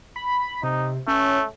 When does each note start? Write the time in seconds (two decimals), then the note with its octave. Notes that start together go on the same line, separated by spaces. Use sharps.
0.16 B5
0.63 C3 D#4
1.08 A3 C#4